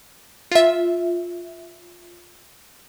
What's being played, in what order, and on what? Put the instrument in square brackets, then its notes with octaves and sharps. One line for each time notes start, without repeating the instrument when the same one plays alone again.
[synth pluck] F4 E5